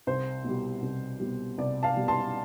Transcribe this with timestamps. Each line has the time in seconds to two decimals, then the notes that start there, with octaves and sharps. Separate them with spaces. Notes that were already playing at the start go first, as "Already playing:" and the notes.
0.07 C2 C5
0.44 B2 G3
0.82 C2
1.20 B2 G3
1.58 C2 D5
1.83 F5 A5
1.96 B2 G3
2.08 A5 C6